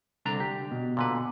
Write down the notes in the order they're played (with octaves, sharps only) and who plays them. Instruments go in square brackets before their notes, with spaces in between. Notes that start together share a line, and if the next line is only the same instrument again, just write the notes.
[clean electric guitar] C2 D3 A#5 [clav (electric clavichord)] D4
[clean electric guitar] G4
B2
[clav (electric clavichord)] A#2 D3 B4